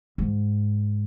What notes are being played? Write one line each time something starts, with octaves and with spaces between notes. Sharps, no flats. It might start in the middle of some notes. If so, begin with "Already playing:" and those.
G#2